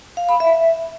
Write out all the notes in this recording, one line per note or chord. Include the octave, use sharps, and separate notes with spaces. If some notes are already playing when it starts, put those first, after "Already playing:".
F5
B5
E5